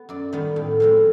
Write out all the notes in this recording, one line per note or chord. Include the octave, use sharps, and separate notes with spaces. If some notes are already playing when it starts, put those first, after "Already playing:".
Already playing: B3
F#2 D5
D#3 G3 B3
A2
F3 G#3 C4